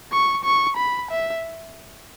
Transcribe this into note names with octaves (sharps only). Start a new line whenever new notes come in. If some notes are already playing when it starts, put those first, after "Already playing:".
C#6
C#6
B5
E5